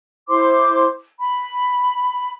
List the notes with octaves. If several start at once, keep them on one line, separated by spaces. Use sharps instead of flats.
E4 C5 C6 D6
B5